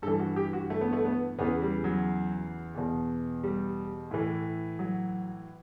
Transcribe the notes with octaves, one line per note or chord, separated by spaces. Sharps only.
G2 E3 A4
F#4
G4
F#4
A3
B3
A3
B3
E2 C#3 E3 B3
G3
F#3
E2 B2
G3
A2 E3
F#3